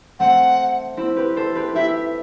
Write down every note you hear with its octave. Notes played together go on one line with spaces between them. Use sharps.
A3 C4 F#5
C4 E4
G4 B4
A4 C5
G4 B4
E4 G4 E5